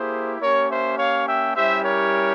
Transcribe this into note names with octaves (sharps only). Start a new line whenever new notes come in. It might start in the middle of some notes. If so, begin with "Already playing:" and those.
Already playing: A#3 E4 G4 G#4 C5
A#3 C#4 G4 A#4 C#5
C5 E5
C#5 F5
E5 G5
G3 C#4 E4 G4 C5 E5
A#4 C#5